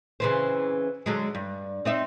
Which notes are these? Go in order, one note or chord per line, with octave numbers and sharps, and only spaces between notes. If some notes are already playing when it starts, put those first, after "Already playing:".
C#3 E3 C4
D3 F#3 G#3
G2
C4 D#4 E5